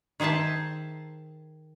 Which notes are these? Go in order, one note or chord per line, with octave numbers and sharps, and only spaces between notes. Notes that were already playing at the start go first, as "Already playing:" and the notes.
D#3 G#4 C5 E5 A5